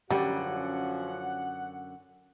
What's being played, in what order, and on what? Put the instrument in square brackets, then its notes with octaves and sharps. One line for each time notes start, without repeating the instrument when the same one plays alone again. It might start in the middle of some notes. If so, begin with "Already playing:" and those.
[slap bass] F#2 D3 [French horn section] F3 C#4 F#4 [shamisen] G3 [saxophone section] F#5